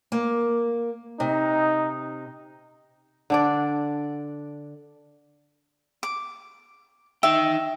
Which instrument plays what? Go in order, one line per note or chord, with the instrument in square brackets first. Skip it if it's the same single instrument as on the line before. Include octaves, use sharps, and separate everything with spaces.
[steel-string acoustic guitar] A#3
[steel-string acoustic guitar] C3 [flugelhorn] D#4
[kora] D3 D4 D5
[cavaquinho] D6
[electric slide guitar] D#4 G5 [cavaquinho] E5